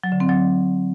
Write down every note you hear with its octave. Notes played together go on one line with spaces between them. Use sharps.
F#3
D3
C4
F#3